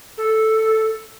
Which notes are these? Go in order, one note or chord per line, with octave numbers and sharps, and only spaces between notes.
A4